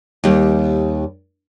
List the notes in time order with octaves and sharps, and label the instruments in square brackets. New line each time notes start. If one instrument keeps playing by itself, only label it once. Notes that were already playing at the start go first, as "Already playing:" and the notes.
[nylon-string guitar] D#2 G3